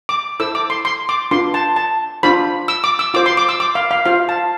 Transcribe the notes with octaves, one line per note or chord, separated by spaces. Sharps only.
D6
E4 A4 C5 E6
D6
C6
C6
D6
D4 F4 B4 C6
A5
A5
D4 F4 C5 B5
E6
D6
E6
F4 C5 D6
C6
D6
E6
D6
F5
F5
F4 C5 F5
A5